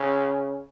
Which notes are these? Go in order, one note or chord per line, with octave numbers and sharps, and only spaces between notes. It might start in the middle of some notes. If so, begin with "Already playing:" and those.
Already playing: C#3